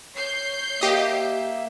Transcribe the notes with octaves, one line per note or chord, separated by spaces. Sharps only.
C#5 G6 C7
A#3 G4 D#5 E5